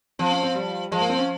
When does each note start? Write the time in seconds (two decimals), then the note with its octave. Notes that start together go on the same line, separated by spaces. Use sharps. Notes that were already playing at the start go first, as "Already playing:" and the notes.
0.19 F3 C4
0.31 C#4
0.43 C4
0.55 G3
0.91 F3 G#3
1.00 A#3
1.10 C4
1.19 C#4